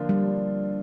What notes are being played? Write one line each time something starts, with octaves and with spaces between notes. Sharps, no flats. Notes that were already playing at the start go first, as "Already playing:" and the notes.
Already playing: D3 F3 A#3 D4 F4
G3